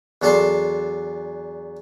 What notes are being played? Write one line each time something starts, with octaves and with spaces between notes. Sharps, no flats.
E2 F#3 D4 A4 A5 C6